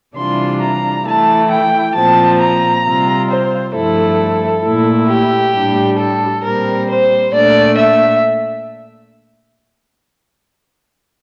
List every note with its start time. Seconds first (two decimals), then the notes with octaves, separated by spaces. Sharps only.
0.15 C3 E3 G3 D4 F4 C6
0.61 A#5
1.05 E3 A3 E4 A5
1.49 G5
1.94 A#2 F3 C4 A5
2.40 A#5
2.84 C3 G3 C4 F4
3.29 C5
3.74 G2 F3 A3 E4 A4
4.63 A#2 A3 E4
5.08 G4
5.54 A2 G3 D4
5.99 A4
6.43 A#2 G3 C4 A#4
6.89 C5
7.33 A#2 A3 D4 D5
7.78 E5